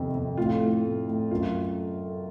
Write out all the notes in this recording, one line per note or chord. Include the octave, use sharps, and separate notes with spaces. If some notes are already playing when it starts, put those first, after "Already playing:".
Already playing: F2 C3 D#3
F2
A2 F4
A2
A2
A2
F#2 F4